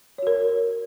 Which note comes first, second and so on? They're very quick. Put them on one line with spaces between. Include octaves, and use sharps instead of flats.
C#5 F#4 A#4